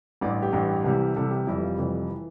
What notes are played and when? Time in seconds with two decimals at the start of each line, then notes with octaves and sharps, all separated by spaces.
0.21 A1 G2 E3 D5
0.42 G4
0.52 A1 G2 E3
0.84 C2 C3 E3 G3
1.15 C2 C3 E3 G3 A4
1.31 G4
1.47 F1 F2 E3 G3 E4
1.63 F4
1.78 F1 F2 E3 G3
2.10 E3